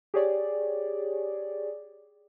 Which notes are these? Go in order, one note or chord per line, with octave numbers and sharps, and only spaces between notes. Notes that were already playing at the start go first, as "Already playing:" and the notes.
G4 G#4 C#5 D5